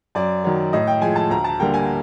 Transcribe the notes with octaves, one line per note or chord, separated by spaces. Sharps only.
F#2 D5
D#3 F#3
A2 D#5
G5
F3 G#3 G#5
A5
D2 A#5
A5
D3 G3 A#3 G5
G#5